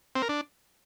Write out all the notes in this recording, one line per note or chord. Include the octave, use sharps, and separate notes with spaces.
C4
A#4
D4